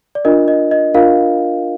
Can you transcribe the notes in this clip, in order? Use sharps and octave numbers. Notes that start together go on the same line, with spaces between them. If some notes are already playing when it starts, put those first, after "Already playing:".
D5
D4 F4 A#4 D#5
D#5
D#5
D4 F4 A#4 F5